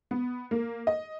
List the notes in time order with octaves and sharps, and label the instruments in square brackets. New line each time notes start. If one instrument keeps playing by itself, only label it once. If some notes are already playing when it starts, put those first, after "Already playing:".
[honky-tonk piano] B3
A#3
D#5